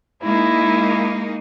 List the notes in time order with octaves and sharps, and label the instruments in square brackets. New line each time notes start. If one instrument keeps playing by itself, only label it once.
[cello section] G#3 A#3 D#4 [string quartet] E4